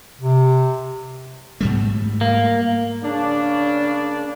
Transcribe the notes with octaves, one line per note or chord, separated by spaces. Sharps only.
C3
G#2 G3 A3
A#3
C#3 A#3 D4